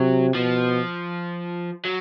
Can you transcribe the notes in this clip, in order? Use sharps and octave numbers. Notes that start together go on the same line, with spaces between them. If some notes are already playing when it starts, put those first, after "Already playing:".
Already playing: C3 F#3
B2 F3
F#3